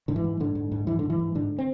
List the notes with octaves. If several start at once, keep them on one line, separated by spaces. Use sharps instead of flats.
G#2 D3
E3
G#2
G#2 D3
G#2
G#2
G#2 E3
G#2 D3
E3
G#2
G#2 D3
C4